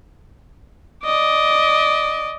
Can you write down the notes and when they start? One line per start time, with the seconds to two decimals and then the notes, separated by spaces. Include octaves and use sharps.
1.05 D5 D#5